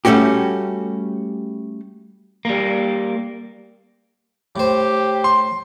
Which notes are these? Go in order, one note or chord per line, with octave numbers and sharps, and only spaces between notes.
G3 A3 C#4 F#4 G4
G3 A#3
A2 G4 C5
C6